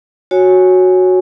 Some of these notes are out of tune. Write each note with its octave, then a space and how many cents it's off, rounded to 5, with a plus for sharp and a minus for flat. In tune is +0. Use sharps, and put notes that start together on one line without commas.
F#4 -5 C#5 +0 G#5 +0